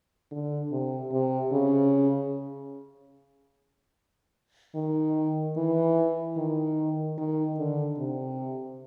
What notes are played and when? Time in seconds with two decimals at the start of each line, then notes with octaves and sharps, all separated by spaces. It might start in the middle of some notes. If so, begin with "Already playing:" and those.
0.32 D3
0.71 C3
1.12 C3
1.52 C#3
4.75 D#3
5.57 E3
6.37 D#3
7.18 D#3
7.58 D3
7.98 C3